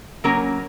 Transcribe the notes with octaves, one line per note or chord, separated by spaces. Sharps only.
C#3 F#3 A#3 C#4 A#4